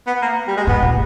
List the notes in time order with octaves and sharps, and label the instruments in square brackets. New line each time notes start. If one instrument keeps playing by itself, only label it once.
[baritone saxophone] B3
A#3
G3
G#3
[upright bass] G#2 [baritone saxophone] B3
[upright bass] A#2